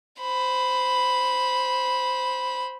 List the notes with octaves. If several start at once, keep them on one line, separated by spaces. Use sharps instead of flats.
C5 B5